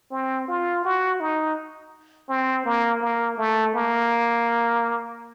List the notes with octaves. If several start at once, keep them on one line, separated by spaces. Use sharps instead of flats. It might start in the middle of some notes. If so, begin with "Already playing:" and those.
C4
F4
F#4
D#4
C4
A#3
A#3
A3
A#3